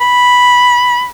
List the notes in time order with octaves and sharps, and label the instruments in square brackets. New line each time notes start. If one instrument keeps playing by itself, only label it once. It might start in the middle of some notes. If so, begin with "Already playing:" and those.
[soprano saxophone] B5